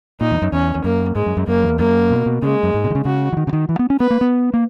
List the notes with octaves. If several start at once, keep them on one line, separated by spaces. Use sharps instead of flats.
A#2 D#4
E2
F#2
E2 C#4
E2
F#2 A#3
G#2 G#3
F#2
F#2
F#2 A#3
E2
F#2 A#3
B2
B2
C#3 G#3
F#2
G#2
B2
D#3
C#3
C#3 F#4
E3
D#3
C#3
D#3
E3
B3
C#4
B3 B4
A#3
B3
A#3